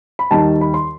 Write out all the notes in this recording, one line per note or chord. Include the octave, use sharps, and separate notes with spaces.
B5
D#2 D#3 G3 D#4 A5
B5
C6